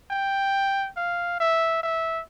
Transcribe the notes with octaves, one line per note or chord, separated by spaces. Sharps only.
G5
F5
E5
E5